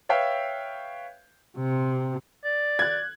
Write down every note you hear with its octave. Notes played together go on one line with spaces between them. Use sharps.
B4 C#5 E5 F5 G5
C3
D5
F#6 G#6